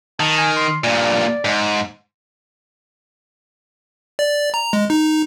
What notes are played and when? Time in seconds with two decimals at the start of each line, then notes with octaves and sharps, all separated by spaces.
0.20 D#3 A5
0.38 G#5
0.56 C6
0.84 G2 A#2 D5
1.45 G#2
4.19 D5
4.54 A#5
4.73 G#3
4.90 D#4